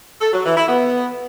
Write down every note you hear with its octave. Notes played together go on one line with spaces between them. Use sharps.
A4
F#3
E3
E4
B3